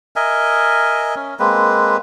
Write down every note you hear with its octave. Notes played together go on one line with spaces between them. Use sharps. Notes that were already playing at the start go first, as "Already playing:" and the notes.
A#4 D#5 E5 G#5
C#4
G#3 A#3 C4 B4